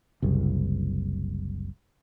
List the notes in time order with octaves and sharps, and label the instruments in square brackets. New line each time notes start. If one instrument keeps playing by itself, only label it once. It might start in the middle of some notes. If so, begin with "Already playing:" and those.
[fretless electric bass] F#1 C2